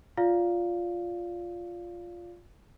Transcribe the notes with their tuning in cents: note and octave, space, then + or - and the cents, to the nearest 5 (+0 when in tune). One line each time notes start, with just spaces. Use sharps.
F4 +0 D5 -25 F5 +0